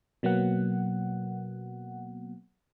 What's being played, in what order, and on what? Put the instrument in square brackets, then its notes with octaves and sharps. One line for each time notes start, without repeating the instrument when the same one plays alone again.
[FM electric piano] B2 F#3 A#3 B3 F#5